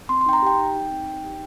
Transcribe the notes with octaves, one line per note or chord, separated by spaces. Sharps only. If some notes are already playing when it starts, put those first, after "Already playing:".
C4 C6
C6
D#4 G5
A#5
G4 G5
D#4
D#4
C4
D#4
G4